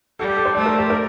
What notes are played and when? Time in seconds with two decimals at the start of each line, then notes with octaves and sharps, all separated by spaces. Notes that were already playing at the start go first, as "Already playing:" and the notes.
0.19 G3 A4
0.27 G4
0.37 A4
0.45 C5
0.55 A3 D5
0.66 A#4
0.79 G4
0.90 A#4